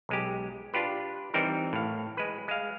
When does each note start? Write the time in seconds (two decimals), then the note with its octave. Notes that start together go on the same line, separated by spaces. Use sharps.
0.09 B1 G#3 G4
0.74 D4 F4 G4 B4
1.34 E3 G3 C4 D#4 A#4
1.73 A2 F5
2.17 G#3 B4
2.48 G#3 F5